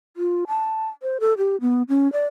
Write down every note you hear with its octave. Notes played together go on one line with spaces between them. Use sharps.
F4
A5
C5
A4
G4
B3
C#4
D5